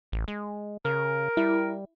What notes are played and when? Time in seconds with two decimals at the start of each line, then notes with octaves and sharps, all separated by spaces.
0.12 A1
0.28 G#3
0.85 C#3 A#4
1.37 G3 E4